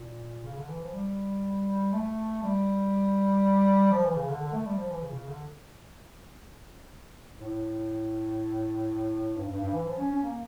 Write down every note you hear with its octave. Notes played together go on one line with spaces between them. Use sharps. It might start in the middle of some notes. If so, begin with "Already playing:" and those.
Already playing: A#2
C#3
D3
E3
F3
G3
A3
G3
F3
E3
C#3
D3
D3
A3
G3
F3
E3
C#3
A#2
C#3
D3
A2
G2
G2
G2
E3
F3
C#4
C#4
A#3